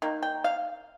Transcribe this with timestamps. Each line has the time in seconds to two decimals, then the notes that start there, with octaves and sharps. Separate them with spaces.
0.02 D#3 A#3
0.23 G5
0.44 F5